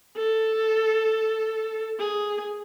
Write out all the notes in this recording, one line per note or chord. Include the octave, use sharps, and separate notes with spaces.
A4
G#4